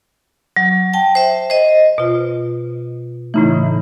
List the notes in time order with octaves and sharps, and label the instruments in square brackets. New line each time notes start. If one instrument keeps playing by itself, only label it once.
[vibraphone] F#3
G5 A5
C5 E5
C5 D#5
[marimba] B2 F4
[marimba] A2 C#3 E3 [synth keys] A3 D#4 E4